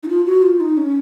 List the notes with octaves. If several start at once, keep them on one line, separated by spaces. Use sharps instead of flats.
D#4
F4
F#4
F4
D#4
C#4